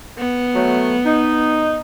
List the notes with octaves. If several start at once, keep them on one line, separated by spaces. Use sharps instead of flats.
B3
F#3 A3
D#4